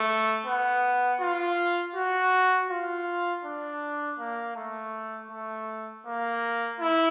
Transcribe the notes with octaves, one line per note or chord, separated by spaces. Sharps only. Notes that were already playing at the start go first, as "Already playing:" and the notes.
Already playing: A3
B3
F4
F#4
F4
D4
A#3
A3
A3
A#3
E4